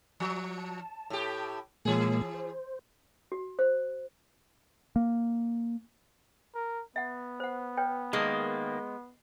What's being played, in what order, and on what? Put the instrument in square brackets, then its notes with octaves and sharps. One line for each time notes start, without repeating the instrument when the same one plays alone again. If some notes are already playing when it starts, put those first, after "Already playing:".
[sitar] F3
[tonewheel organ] A5
[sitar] A2 G4
[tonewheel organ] A#2 G#3 A#3 [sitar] E3 G#4
[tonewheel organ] C5
[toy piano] F#4
C5
[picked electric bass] A#3
[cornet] A#4
[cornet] B3 [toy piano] E5 F#5
[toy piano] C5 F#5
B4 C#5 G5
[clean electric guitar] D#3 A#3 [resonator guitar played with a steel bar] G#3